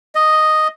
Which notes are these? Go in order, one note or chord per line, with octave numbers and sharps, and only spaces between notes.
D#5